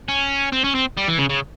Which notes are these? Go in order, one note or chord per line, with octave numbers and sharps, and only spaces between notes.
C#4
C4
C#4
C4
G3
E3
C#3
C#3